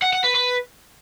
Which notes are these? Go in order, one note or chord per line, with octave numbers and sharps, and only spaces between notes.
F#5
F#5
B4
B4